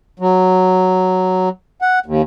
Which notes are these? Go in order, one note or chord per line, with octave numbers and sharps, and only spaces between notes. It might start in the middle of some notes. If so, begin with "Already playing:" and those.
F#3
F#5
D#2